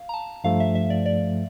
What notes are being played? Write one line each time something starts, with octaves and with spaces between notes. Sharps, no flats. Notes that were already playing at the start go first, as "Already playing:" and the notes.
Already playing: F5
A#5
A5
G2 F3 A3 F5
E5
E5
D5
D5